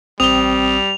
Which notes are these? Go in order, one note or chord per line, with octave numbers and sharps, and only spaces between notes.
A1 G3 C4 D#6 F7 G7